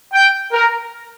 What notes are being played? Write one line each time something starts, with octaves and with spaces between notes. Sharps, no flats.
G5
A#4